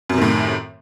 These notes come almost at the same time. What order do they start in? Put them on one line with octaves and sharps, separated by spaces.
F#2 C3 D#3 A2